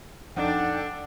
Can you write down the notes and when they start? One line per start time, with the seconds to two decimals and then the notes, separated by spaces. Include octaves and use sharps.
0.37 F2 D4 D#4 A4 F#5 G5